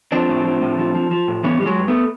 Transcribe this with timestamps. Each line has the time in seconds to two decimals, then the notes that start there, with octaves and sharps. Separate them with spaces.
0.12 F3 C4 D4
0.28 A2
0.45 F3
0.62 A2
0.79 F3
0.95 F3
1.11 F3
1.28 A2
1.44 E3 B3 C#4
1.59 E3 G3
1.66 F#3 G#3
1.77 G2
1.88 A3 B3